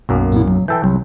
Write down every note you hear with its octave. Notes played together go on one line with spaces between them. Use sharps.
B1 F#2 A#3
A#2 B3 E4
F#3
E3 A4 G5 G6
C2 F#3